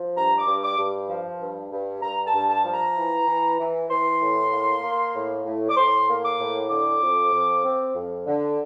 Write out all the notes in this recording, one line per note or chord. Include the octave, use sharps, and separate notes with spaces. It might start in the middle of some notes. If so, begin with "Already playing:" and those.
Already playing: F3
G2 A#5
D6
G2
D6
G2
F3
G2
G2
G2 A#5
A5
G2
A5
F3
A#5
E3
E3
E3
E3 C6
A2
A#3
A#3
A2
A2
D6
A2 C6
A#3
D6
A2
D3 D6
F2
F2
C4
F2
D3